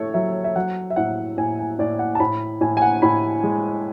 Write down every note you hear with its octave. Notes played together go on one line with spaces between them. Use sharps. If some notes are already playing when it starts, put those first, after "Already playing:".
Already playing: A2 A3 C#5
F#3 E5
E5
F#3 F#5
E5
A2 F#5
A2 G#5
G#5
A2 D5
F#5
A5
A2 B5
A2 G#5
G#5
F#5
A2 B5
G#3